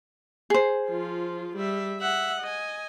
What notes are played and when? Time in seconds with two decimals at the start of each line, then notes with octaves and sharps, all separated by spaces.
0.50 G#4 C5
0.89 F3 F4
1.56 G3 E5
1.99 E5 F#5
2.40 D#5 G#5